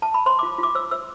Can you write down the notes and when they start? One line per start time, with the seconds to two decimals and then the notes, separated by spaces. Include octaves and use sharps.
0.02 A5
0.14 B5
0.26 C5 C6
0.39 D6
0.43 F4
0.58 F4 D6
0.75 C5 E6
0.91 C5 E6